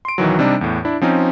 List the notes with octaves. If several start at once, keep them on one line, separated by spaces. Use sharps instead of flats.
C6 D7
B1 D#3 E3 F#3
C3 G3 D4 D#4
E2 A2
D4 E4
F3 C4 C#4 D#4